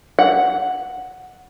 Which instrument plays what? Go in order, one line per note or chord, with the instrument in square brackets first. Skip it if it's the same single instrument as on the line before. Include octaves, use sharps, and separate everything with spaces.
[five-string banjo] F#5